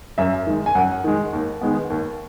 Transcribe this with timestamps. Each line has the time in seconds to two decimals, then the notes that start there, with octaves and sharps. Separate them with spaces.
0.18 F#2 E5
0.47 D#3 G#3
0.66 G#5
0.75 F#2 F#5
1.04 D#3 G#3
1.33 D#2
1.61 D#3 G#3 B3
1.90 D#2